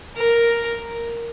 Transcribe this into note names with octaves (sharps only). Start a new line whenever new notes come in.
A#4